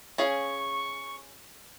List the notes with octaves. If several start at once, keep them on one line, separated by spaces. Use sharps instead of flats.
C#4 G#4 F5 C#6